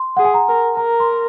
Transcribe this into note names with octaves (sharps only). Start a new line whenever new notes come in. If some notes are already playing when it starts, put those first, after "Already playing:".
Already playing: C6
G#4 F#5
G#5
A#5
A#4
A#4 A#5
C6